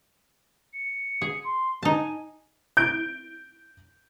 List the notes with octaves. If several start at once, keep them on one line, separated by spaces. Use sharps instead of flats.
C#7
G#4
C6
D#4 G#5 A5
G6 D7